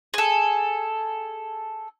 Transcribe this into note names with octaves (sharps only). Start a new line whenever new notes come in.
G#4 A4